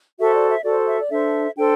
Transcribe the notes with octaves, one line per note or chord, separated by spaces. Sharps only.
F#4 A4 C5 E5
D5
E5
F#4 A4 C5 D5
E5
D5
D4 A4 C5 E5
D4 A4 C5 G5